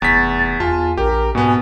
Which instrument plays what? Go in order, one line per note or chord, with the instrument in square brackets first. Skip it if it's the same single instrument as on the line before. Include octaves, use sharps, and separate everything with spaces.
[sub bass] F1 [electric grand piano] E2 B6 [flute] A6
[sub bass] E2 [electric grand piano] F4 A5 [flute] G#5
[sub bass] A#1 [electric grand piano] G4 [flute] A#4
[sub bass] G#2 [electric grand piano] B2 B3 [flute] G#5